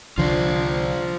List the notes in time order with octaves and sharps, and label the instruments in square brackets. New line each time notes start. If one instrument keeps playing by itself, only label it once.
[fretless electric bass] C2 D3 F3 [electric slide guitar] F4 C5 D5